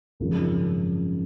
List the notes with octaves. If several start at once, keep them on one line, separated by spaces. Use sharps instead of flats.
G#1 F#2 C#3 F3